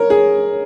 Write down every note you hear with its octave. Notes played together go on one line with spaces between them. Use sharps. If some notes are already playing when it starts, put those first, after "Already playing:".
Already playing: A#4 C#5
G#4